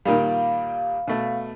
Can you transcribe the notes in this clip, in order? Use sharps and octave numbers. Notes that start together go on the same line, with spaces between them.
A#2 D#3 G3 F5
B2 A3